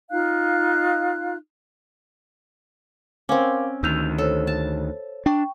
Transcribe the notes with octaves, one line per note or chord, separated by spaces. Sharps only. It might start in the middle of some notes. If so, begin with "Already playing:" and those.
D#4 F4 F5 F#6
C4 C#4 A#4 F5 D6
D2 D#3 E6 G6 F7
A4 C5 C#5
A5
D4 G5 C#6